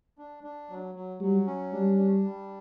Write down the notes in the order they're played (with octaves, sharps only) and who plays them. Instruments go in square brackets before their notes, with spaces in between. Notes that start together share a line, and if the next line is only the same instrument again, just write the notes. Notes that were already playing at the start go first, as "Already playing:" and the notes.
[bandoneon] D4
D4
F#3
F#3
[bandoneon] F#3 [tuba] G3
[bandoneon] C#4
[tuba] G3 [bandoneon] D4
[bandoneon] D4
G3